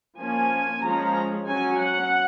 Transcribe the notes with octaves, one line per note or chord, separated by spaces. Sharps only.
F3 A#3 C#4 G#5
F3 G#3 C#4 A#5
F#3 C#4 G#5
F#5